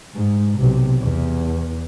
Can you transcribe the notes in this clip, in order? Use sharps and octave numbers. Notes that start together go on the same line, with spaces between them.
G#2
B1 C3
E2